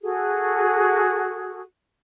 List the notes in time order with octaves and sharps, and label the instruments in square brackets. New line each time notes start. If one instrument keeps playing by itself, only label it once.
[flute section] F#4 G#4 A4